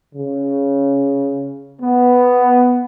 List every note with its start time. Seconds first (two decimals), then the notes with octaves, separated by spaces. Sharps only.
0.15 C#3
1.82 B3